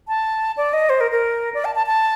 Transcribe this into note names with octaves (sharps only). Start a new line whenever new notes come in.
A5
D5
D#5
C5
A#4
A#4
D5
A5
A5
A5